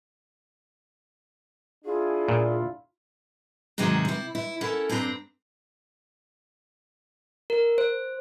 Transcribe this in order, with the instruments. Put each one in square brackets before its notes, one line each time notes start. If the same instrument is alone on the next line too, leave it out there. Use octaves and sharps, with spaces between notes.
[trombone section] D4 E4 F4 [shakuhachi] G#4
[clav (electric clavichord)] A#2
[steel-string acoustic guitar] G#2 C3 D#3 F#3 G#3 F#4
C3 E4
E4
C#4 E4 A4 A#4 F#5
G2 C4 D4 A4 A#5
[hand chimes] A#4
C5